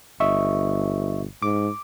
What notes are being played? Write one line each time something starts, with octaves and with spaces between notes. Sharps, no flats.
G1 D#5 E5 C#6
G#2 D6